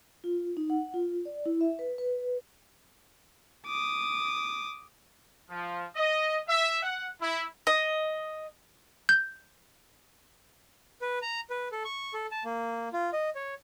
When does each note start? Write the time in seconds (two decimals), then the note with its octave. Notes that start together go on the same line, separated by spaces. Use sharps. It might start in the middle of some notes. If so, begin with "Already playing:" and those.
0.24 F4
0.57 D#4
0.70 F#5
0.94 F4
1.25 D5
1.46 E4
1.61 E5
1.79 B4
1.98 B4
3.67 D6 D#6
5.49 F3
5.95 D#5
6.48 E5
6.83 F#5
7.21 E4
7.67 D#5
9.09 G6
11.02 B4
11.22 A#5
11.50 B4
11.72 A4
11.85 C#6
12.14 A4
12.31 A5
12.45 A#3
12.93 F4
13.13 D#5
13.35 C#5